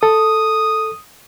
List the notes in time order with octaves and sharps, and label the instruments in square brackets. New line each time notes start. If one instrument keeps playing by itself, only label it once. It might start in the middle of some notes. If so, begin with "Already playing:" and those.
[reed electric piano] A4 [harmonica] D#6